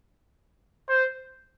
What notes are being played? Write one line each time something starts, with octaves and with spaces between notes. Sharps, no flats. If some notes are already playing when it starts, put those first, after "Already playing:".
C5